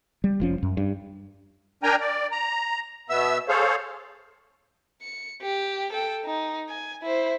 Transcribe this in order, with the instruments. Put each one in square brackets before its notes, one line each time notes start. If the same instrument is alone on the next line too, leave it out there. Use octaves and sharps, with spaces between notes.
[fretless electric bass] G3
F1 F3 C#4
F#2
G2
[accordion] D4 A#4 G5 G#5 A#5
D5
A#5
B2 B3 E5 E6
G#4 A4 C5 C#5 F5
[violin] C#7
G4
A4 G5
D#4
G#5
E4 C5